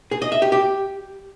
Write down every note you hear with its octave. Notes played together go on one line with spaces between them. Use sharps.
G#4
D#5
E5
G4
G4